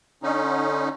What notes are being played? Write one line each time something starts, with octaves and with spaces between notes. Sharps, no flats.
D3 C#4 D#4